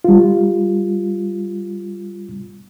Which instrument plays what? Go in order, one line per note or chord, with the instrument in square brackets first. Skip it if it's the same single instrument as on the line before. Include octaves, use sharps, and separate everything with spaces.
[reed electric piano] G3 F4